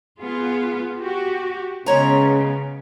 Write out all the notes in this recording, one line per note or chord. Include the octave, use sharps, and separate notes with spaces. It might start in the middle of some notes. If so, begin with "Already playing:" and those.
B3 F4 G#4
F#4 G4
C#3 G#3 B3 C#4 C#5 A#5